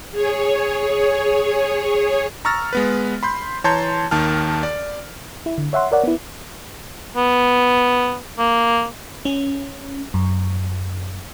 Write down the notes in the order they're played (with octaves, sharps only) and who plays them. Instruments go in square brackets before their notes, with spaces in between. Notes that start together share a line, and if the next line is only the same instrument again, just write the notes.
[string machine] G#4 C#5
[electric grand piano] A#5 C#6 E6 F6 A6 A#6
G#3 B3 B4
B5 C6 G6
E3 C#5 A5 A#5 C6 G6
D#2 D#3 A5 F6
D5
[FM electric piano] E4
D3
C#5 E5 F#5 C6
A#4 C#5 D5 F#5
B3 E4
[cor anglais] B3
A#3
[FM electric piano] C#4
F#2